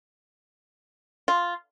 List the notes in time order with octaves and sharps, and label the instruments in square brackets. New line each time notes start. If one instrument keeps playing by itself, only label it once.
[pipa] F4